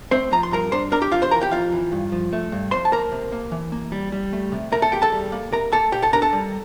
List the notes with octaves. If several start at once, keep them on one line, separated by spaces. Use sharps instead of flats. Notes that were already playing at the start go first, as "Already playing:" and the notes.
A3 C4 C5
F3 A#5
C6
G2 A#4 A#5
D4 C5 C6
D4 A#4 A#5
G4 G5
F2 F4 F5
C5 C6
E3 A#4 A#5
G4 G5
F2 F4 F5
E3
G2
F3
A3
G2
F2 C5 C6
A5
A#3 A#4 A#5
C3
A#3
E3
A#3
G3
G3
A3
C3
A3 A#4 A#5
A4 A5
E2 G4 G5
A4 A5
G3
A#3
C3 A#4 A#5
A#3 A4 A5
A#2 G4 G5
A4 A5
D4 A#4 A#5
A4 A5
G3